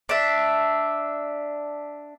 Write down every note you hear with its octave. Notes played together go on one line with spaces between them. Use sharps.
D4 E5